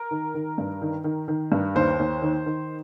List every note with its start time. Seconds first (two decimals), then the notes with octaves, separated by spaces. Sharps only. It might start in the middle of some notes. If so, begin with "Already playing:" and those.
Already playing: A#4
0.11 D#3
0.35 D#3
0.58 G2
0.82 D#3
1.04 D#3
1.28 D#3
1.52 G2
1.75 D#2 C5
1.99 D#2
2.22 D#3
2.46 D#3